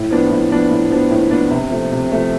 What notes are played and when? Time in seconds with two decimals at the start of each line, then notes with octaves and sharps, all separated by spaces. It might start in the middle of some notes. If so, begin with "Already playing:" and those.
Already playing: A2
0.11 F3 B3 D4
0.30 A2
0.50 F3 B3 D4
0.71 A2
0.91 F3 B3 D4
1.11 A2
1.31 F3 B3 D4
1.51 C3
1.70 F3 A3
1.92 C3
2.12 F3 A3